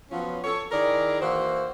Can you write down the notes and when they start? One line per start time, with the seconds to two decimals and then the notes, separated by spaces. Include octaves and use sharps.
0.11 F3 F#3 B3 C#4 F4 F#4
0.44 A4 C#5
0.72 D#3 E4 G#4 A#4 D5
1.21 E3 A#3 F#4 C5